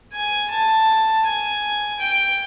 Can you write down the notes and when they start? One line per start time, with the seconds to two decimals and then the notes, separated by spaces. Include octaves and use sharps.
0.13 G#5
0.51 A5
1.25 G#5
2.00 G5